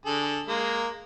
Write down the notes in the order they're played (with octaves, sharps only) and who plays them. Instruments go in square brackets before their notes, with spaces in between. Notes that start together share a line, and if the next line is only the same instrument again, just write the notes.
[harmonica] D3 G#4 A4
G#3 A#3